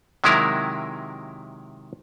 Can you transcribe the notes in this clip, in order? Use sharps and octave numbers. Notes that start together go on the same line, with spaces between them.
C3 D#3 F#3 G#3 E4 A#4